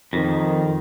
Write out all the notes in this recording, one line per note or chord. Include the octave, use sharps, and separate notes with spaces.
F2 D#3